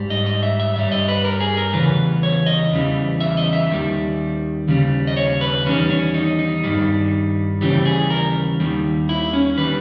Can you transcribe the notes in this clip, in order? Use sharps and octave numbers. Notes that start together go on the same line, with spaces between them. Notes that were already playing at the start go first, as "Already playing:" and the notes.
Already playing: G#2 G3
D#5
D#5
E5
E5
G2 G3 E5
D#5
B4
A#4
G#4
A#4
E2 C#3 E3 G3 B4
C#5
D#5
E2 C#3 E3 G3
E5
D#5
E5
D#2 D#3 G3
D#2 C#3 G3
D#5
C#5
B4
E2 D#3 G3 C#4
C#4
D#4
D#4
G2 D#3 G3
D#2 C#3 E3 G3 G4
G#4
A#4
D#2 D#3 G3
E4
C#4
D#3 G3 B4